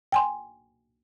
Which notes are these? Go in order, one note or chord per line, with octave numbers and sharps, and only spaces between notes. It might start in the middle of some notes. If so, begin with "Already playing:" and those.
G5 G#5 C6